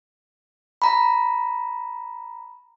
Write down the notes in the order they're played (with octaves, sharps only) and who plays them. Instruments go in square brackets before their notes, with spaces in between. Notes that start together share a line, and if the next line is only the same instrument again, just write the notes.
[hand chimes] A#5 B5